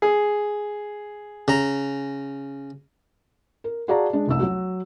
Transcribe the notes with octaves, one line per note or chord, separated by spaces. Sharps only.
G#4
C#3 A#5
A#4
F#4 G#4 D5 F5 A5 A#5
G#3 D4
F1 C2 E6
F#3 F#4